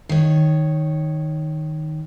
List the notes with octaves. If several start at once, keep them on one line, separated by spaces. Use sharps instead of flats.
D#3 C#5